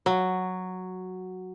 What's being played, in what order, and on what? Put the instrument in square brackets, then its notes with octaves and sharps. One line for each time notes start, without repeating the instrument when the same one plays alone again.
[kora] F#3